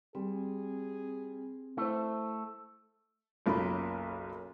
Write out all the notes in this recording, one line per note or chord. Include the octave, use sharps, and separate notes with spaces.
G3 C4 G#4
A3 E4 C5
F#1 B1 A#3 C#4 F4 B5